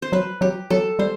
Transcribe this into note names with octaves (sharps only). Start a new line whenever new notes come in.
C5
F#3 B4
F#3 G4
F#3 A4
G3 C5